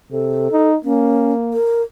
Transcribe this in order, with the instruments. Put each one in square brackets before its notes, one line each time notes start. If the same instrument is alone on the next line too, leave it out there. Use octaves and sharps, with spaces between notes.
[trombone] C3 [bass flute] A4
[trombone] D#4
[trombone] A#3 [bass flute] C#4
[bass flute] A#4